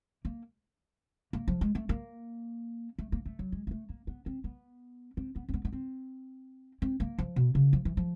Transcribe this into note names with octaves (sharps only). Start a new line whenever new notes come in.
A#3
A#3
F3
G#3
A3
A#3
A3
A#3
A3
F#3
G#3
A#3
A3
A#3
B3
C4
B3
C4
B3
C4
B3
B3
C4
C4
A#3
F3
B2
C#3
F3
E3
F3